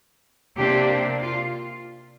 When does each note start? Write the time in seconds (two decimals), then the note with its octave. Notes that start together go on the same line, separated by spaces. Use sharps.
0.56 C3 A#3 D4 G4
1.22 F4